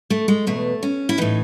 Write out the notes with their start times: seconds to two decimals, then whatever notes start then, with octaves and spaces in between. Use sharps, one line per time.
0.10 A3
0.28 G#3
0.47 E2 B2 A3
0.83 C#4
1.09 E4
1.18 A2 E3 D#4